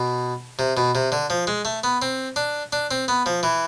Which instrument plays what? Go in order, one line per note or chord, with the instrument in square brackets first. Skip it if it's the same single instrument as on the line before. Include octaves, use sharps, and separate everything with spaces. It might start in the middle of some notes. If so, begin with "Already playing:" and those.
Already playing: [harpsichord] B2
C3
B2
C3
D3
F3
G#3
A3
B3
C4
D4
D4
C4
B3
F3
E3